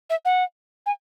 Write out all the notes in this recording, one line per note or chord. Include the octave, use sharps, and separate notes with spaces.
E5
F#5
G#5